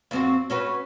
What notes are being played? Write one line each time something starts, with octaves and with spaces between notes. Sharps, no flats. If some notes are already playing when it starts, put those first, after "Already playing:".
F2 C4 F#4
C#4 F#4 B4